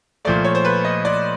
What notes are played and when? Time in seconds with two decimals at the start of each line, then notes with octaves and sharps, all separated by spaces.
0.25 A#2 F3 A3 D5
0.44 C#5
0.55 C5
0.65 B4
0.85 D#5
1.05 D5